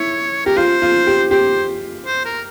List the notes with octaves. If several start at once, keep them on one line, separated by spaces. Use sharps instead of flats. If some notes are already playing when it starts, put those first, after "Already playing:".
Already playing: E4 C#5
G4 A#4
F4 C5
F4
G4
G4 C5
C5
A#4